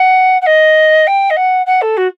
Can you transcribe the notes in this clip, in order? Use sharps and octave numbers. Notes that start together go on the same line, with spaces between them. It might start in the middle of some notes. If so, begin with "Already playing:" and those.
Already playing: F#5
F#5
D#5
G5
D#5
F#5
F#5
A4
F#4